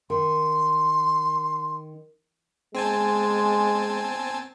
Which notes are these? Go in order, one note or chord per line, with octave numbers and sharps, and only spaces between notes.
D#3 C6
G#3 C4 G#5 A5